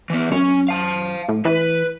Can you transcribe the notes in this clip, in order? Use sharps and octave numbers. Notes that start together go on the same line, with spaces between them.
E3 B3
F#2 C#4
F5 A5
A2
E3 B4